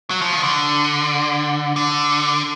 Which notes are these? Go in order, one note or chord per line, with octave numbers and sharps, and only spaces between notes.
F#3
F3
D#3
D3
D3